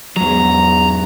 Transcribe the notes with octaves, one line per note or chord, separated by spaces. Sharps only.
E2 G#2 F#3 A#5